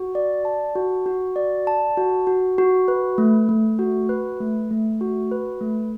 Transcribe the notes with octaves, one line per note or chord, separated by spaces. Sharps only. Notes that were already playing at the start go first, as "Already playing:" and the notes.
Already playing: F#4
D5
A5
F#4
F#4
D5
A5
F#4
F#4
F#4
B4
A3
A3
F#4
B4
A3
A3
F#4
B4
A3